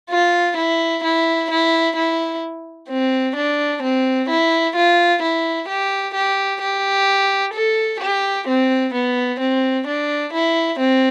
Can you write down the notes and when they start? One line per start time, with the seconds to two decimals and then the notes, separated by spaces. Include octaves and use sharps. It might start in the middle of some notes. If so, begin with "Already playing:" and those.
0.10 F4
0.57 E4
1.04 E4
1.50 E4
1.96 E4
2.89 C4
3.36 D4
3.83 C4
4.29 E4
4.76 F4
5.22 E4
5.68 G4
6.14 G4
6.62 G4
7.54 A4
8.00 G4
8.47 C4
8.94 B3
9.40 C4
9.87 D4
10.33 E4
10.79 C4